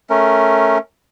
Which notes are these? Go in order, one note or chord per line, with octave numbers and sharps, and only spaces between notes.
A3 C#4 A#4